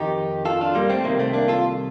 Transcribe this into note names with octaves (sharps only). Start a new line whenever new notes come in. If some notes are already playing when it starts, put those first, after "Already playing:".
Already playing: F2 D#3 D#4 G4
F4 A4
D4 F4
G3 A#3
A3 C4
C2 C3 D#3 G3 A#3
A3 C4
A#3 D4
F4 A4